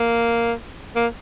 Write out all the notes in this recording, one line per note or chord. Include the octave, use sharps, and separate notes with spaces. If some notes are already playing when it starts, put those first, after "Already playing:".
Already playing: A#3
A#3